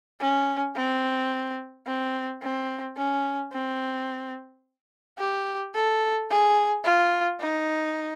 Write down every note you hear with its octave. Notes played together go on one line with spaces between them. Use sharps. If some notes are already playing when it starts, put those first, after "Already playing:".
C#4
C4
C4
C4
C#4
C4
G4
A4
G#4
F4
D#4